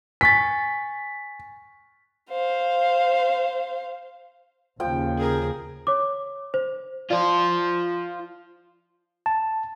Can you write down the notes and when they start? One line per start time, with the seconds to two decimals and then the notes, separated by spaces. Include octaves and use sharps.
0.21 G#5 C#6 A6 B6
2.31 C5 F5
4.80 D#2 C#3 F3 G5
5.18 G#4 A#4
5.87 C#5 D6
6.54 C5
7.11 F4 C5 D5
9.26 A5